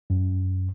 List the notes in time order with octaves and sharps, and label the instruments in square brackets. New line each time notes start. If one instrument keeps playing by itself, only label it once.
[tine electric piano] F#2